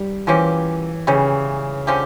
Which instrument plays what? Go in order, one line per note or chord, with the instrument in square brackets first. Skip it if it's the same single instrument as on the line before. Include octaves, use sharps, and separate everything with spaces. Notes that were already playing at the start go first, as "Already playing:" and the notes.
Already playing: [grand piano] G3
[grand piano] E3 [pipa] F3 A#3 C#4 G4
[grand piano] C#3 [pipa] E3 G3 C#4
[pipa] D3 F3 C#4 G4